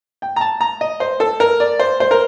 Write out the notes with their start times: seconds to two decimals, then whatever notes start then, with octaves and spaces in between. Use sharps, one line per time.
0.22 G5
0.36 A#5
0.41 A5
0.61 A#5
0.81 D#5
1.00 C5
1.20 A4
1.40 A#4
1.60 D5
1.79 C5
2.00 C5
2.11 A#4